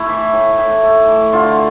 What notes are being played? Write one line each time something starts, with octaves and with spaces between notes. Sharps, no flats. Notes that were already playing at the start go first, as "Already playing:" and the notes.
Already playing: A3 E4
E3
A2
A2
A3
E3
D3 F4